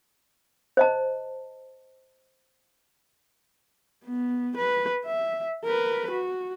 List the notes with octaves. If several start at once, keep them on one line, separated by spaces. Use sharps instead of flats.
C5 D#5 A5
B3
B4
E5
A#4 B4
F#4